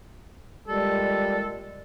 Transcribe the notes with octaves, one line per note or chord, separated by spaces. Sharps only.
A#2 G3 G#3 A4